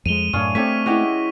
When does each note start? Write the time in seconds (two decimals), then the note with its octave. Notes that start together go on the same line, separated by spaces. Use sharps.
0.06 F2 G#3 D#7 F7 G7
0.33 F#2 A2 D4 G#4 C#5 F5
0.55 A3 B3 C4 G4 A4 C#5 E5 B6
0.86 G#3 C#4 E4 F#4 G4